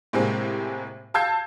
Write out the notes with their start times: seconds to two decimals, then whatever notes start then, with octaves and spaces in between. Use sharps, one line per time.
0.13 A2 C3 G#3 A#3 C4
1.14 F5 A5 E6 G6 G#6 C7